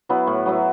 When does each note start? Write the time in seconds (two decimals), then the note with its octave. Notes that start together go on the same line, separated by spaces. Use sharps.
0.09 F#3 B3 E4
0.27 A2
0.46 F#3 B3 E4